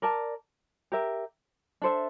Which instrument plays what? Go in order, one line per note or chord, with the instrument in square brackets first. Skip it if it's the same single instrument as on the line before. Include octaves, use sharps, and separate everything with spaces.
[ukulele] A#4 D5 A5
G4 A#4 E5
D4 A4 C5 E5